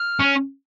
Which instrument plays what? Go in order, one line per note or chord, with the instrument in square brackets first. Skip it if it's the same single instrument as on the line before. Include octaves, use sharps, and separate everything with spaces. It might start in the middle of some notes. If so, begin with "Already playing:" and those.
Already playing: [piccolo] F6
[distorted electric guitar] C#4